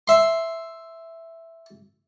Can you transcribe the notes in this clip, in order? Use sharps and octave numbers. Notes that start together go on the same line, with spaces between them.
E5 C6